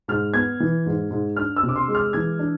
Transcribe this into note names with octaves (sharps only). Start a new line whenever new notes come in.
G#2 F6
B3 G#6
E3
G#2
G#2
D4 F6
E6
C3
D6
C6
G#3
F6
E3 G#6
D4